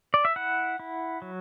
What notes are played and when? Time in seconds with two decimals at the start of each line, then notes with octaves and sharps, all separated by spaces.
0.14 D5
0.25 E5
0.36 E4 F#5
0.79 E4
1.22 F#3